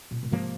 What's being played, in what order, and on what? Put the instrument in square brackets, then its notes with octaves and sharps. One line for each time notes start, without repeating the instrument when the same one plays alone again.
[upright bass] A#2
A#2
[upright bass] G#2 [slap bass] C3 F3 A#3